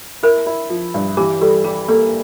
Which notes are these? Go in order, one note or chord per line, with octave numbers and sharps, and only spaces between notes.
E4 A#4
E4
F3
G2
E3 G4
G3 A4
G3 G4
A#3 A4